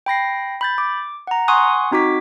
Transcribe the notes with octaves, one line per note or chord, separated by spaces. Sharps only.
G5 B5 A#6 C7
B5 G6 A6
D6
F#5 A#5
F#5 G#5 C6 C#6 D#6 F#6
C4 D#4 F#4 D6 B6